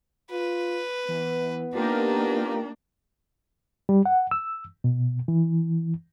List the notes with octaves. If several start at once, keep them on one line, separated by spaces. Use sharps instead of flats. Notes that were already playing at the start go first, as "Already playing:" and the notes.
F4 B4
E3 B3
A#3 D4 D#4 F4 G4 A#4
G3
F#5
E6
B2
E3